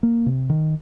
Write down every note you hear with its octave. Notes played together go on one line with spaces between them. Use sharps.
A#3
C3
D#3